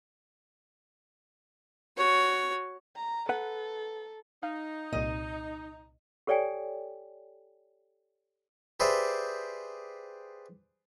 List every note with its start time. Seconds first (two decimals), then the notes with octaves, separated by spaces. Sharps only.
1.97 F#4 C#5
2.96 A#5
3.29 A4 B4 F#5
4.43 D#4 F5
4.93 C2 A#2 D#5
6.27 G4 A4 C#5 D5 G5 G#5
8.80 G4 G#4 B4 C5 D5 E5